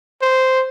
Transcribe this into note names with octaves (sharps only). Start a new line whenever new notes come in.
C5